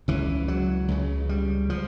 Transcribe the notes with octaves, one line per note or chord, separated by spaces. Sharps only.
C#2 C#3 E3
F#3
C#2 C#3
G3
F3